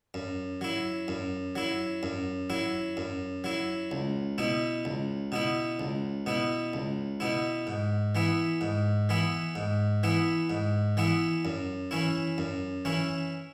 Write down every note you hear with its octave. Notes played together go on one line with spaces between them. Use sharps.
F#2
F#3 E4
F#2
F#3 E4
F#2
F#3 E4
F#2
F#3 E4
C#2
B2 B3 E4
C#2
B2 B3 E4
C#2
B2 B3 E4
C#2
B2 B3 E4
G#2
E3 B3 E4
G#2
E3 B3 E4
G#2
E3 B3 E4
G#2
E3 B3 E4
F#2
E3 C#4 E4
F#2
E3 C#4 E4